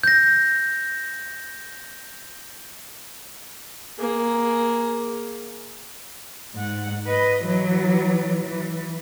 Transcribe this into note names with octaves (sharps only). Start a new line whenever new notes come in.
G6 A#6
A#3 G#4
G#2 F#5
B4 D#5
E3 F#3
E3